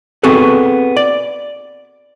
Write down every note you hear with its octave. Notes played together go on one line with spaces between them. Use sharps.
B3 C4 F#4 G#4 A4 B4
D5